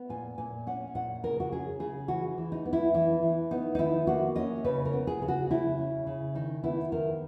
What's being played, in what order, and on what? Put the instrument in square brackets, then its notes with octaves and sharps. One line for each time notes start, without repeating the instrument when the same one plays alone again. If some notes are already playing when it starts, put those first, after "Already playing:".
Already playing: [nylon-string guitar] B3
A#2 G#5
A#2 G#5
C#4 F#5
A#2 F#5
C#3 A#4
F#4
C#4 G#4
C#3 G#4
E3 F#4
E3
D#4
B3
E4
E3 E4
E3
B3 D#4
D#4
D#3 E4
A#3 F#4
C#4 D#5
C#3 B4
A#4
B3
G#4
C#3
F#4
C#3 E4
C#4
C#3
D#3 D#4
B3 E4
D#3 A#4